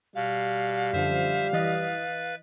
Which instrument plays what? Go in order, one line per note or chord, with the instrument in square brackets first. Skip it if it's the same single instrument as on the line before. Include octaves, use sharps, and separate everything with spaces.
[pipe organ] B2 [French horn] G3 [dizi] F5
[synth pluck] F#2 D3 F3 [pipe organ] C5 E5
[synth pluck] E3 D#5 B6 [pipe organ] B4 A6